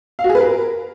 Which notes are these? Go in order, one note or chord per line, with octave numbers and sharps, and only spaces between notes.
F5
F#4
G#4
B4
A#4